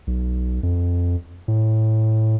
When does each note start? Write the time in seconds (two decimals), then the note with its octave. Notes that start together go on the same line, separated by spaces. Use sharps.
0.07 B1
0.63 F2
1.48 A2